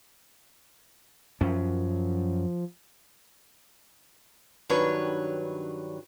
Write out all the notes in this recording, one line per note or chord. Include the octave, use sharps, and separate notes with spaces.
F#2 F3 C#4
G2 D#3 F#3 D4 B4 C#5